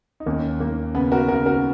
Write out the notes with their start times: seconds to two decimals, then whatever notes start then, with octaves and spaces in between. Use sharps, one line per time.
0.20 D#4
0.26 D#2 A#3 C#4
0.60 D#2 A#3
0.95 C#3 B3
1.12 F#4 A#4
1.28 C#3 F#4 A#4
1.46 F#4 A#4